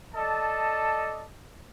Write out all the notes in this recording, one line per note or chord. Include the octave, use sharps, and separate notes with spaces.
A4 D5 D#5 A5